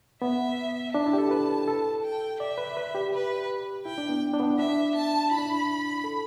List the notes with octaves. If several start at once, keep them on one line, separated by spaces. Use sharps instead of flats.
B3 E5
D4 A5
E4
G4
A4
B4
A4
G5
D5 E5
B4
B4
G4
B4
E4 G5
D4
B3
D4
B3
D4 E5
A5
E4 B5
D4
E4
A4